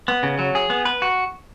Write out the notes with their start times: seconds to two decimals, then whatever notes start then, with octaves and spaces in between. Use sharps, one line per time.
0.08 B3
0.23 C#3
0.39 F#3
0.55 G#4
0.70 B3
0.85 B4
1.02 F#4